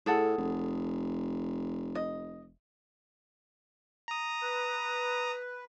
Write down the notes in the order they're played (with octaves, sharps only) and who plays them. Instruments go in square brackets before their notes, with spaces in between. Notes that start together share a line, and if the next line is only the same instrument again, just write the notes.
[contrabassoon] A2 [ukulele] G#4 A4 F#5
[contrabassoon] F1
[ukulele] D#5
[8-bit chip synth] A#5 D#6
[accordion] B4